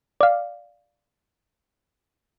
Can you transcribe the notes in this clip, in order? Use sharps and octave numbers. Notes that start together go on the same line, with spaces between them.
D5 F5